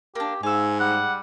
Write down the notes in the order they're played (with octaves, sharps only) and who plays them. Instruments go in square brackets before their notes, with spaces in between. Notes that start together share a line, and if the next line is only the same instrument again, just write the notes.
[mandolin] A#3 D4 [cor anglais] G4
[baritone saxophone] G#2 [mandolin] F5 E6 [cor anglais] G#5
[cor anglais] G3 [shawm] F#5